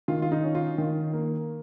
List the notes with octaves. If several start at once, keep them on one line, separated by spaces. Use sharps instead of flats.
D#3 F4
F4
D#4
C#4
F4
D#3
A#3